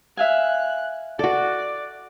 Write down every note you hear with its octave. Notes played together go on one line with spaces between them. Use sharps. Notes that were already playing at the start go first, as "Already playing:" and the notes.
E5 F5 G#5 F#6
F#4 A4 D5